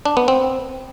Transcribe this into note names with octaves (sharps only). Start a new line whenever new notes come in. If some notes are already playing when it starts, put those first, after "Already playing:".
D4
B3
C4